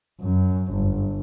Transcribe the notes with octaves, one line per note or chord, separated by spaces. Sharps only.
F#2
G1